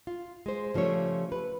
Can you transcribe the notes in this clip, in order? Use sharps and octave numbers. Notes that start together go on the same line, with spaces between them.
F4
G#3 C5
C#3 F3 G3 A3 C#5
B4